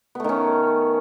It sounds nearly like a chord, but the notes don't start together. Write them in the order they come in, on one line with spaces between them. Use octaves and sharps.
B3 A3 D#3 C#4